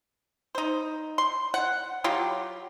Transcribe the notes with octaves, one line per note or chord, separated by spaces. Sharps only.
D#4 C5
C6
F#5
F#3 F4 G4